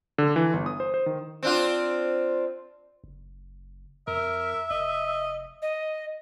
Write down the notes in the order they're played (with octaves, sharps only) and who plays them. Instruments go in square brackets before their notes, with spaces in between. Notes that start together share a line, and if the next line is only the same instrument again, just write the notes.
[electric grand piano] D3
E3
G1
D#6
C5
C5
D#3
[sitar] C4 D4 F4
[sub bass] F#1
[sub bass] F2 [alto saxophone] A#4 [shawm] E5
[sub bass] F1 [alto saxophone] D#5
[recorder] D#5